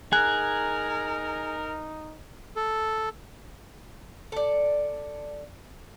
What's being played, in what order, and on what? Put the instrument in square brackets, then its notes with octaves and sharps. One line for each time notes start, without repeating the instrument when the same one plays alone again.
[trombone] D#4 [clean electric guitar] G#4 [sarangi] A#4 [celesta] F#6
[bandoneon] A4
[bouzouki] A4 D5